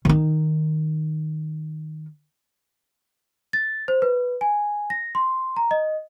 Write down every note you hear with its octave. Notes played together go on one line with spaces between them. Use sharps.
D#3 D#4
A6
C5
B4
G#5
A#6
C6
A#5
D#5